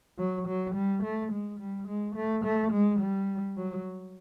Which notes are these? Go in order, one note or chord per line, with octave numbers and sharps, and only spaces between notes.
F#3
F#3
G3
A3
G#3
G3
G#3
A3
A3
G#3
G3
F#3